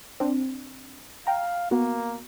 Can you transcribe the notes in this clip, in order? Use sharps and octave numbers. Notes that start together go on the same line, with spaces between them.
C4 D4
F5 G5 A#5
A#3 B3 F#4